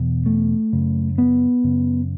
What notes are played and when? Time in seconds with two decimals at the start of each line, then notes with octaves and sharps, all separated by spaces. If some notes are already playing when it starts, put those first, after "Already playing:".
Already playing: E2 B2
0.26 A3
0.73 F#2 C#3
1.18 B3
1.64 F#2 C#3